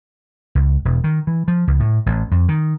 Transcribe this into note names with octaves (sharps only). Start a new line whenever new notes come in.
C#2
E1
D#3
E3
F3
C#2
A2
A1
F2
D#3